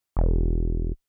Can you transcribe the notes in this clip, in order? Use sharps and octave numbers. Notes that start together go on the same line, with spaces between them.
E1